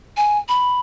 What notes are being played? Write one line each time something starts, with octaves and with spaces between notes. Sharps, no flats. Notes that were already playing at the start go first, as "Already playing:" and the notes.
G#5
B5